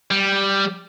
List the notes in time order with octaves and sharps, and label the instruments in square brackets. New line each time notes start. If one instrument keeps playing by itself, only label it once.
[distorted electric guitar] G3